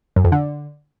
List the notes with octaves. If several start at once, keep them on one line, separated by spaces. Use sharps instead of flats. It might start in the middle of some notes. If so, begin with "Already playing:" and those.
F#2
F2
D3